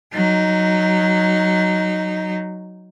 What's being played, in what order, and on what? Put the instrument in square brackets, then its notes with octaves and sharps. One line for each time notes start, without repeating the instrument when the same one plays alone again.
[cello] F#3 D#4